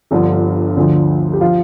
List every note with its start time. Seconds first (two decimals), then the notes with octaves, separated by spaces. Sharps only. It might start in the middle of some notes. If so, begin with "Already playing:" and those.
0.11 G1 G2 D3 F3
0.77 D2 D3 F3
1.33 G4
1.41 F3 F4